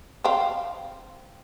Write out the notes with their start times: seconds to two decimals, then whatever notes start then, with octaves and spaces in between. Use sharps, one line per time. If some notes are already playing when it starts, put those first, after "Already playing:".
0.24 C4 F5